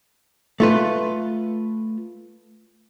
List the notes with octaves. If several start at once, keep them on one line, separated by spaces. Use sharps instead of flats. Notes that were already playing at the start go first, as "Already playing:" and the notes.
A3 F4 B4